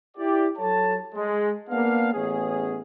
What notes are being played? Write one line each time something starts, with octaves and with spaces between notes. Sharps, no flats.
E4 G4 D5
F#3 A4 C#5 A5
G#3
A#3 B3 D4 F5
A1 B3 C#4 G#4